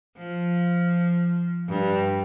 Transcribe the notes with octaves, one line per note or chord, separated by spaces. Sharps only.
F3
G2